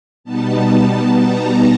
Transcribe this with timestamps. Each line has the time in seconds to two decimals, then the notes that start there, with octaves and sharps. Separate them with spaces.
0.24 B2 G3 B3 D#4 A5
1.17 A#5